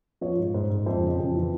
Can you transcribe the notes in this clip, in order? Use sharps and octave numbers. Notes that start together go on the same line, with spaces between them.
F3 C#5
G#2
G#2 C5
G#2
F2 C5
C#3
F2
E3